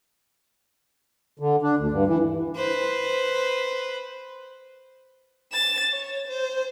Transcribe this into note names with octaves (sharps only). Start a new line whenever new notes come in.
D3
D4
D2
G2
E3
B4 C5
A6 E7
C#5
C5